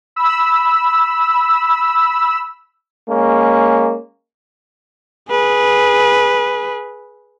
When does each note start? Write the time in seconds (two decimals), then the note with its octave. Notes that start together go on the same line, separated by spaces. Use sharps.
0.16 B5 E6
3.09 G#3 A#3 C#4
5.30 G#4 B4